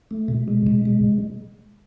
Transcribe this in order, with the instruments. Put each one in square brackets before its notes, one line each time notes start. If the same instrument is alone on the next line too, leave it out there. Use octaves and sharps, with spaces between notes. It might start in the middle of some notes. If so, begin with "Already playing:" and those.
[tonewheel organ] A3
B2
G#3
B2
G#3